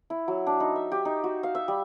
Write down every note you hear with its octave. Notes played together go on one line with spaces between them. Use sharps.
E4
F#3
D4
D#4
E5
G4
D#4
F#4
F5
E5
G3